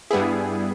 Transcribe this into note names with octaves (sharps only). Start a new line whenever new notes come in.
G2 G3 B3 E4 G#4